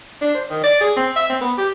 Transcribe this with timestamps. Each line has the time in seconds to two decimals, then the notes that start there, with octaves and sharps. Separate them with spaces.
0.21 D4
0.35 C5
0.50 D#3
0.64 D5
0.81 G#4
0.96 C4
1.16 E5
1.30 C4
1.41 B3
1.57 G4